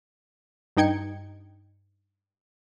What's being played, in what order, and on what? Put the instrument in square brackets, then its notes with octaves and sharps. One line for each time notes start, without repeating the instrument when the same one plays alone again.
[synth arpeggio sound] G2 D#4 G5 G#6 C#7